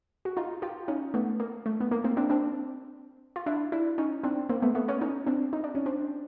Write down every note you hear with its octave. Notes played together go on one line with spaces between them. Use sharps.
F#4
D#4 F4
F4 G4
C#4 D#4
A3 B3
A#3
A3
B3
A#3
A#3 C4
C4 D4
C4 D4
F4
D4 E4
D4 E4
C#4 D#4
C4 D4
A#3 C4
A3 B3
A3 B3
B3 C#4
C#4 D#4
C4 D4
D#4
D4
C#4
C4 D4